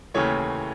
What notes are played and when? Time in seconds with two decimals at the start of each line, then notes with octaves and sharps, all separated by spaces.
0.14 D#2 C#3 E3 A3 C#5